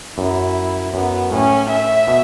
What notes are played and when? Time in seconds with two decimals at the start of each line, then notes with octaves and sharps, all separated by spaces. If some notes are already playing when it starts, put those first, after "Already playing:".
0.17 F#2 E4
0.94 F#2 B3
1.31 A2 C#4
1.70 E5
2.08 B2